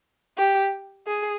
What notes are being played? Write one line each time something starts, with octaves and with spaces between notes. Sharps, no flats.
G4
G#4